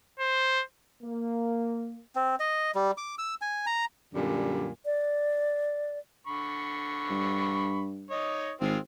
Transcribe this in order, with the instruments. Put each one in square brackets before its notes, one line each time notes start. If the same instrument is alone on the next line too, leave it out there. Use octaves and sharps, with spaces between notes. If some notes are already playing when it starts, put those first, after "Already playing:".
[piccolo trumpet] C5
[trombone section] A#3
[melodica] C4
D#5
G3
D6
E6
G#5
A#5
[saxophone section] F#2 A#2 D3 G3
[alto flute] D5
[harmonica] D3 B5 C#6
[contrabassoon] G2
[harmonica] D#4 C#5 D#5
[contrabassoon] G#1 [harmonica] G#3 C4 F4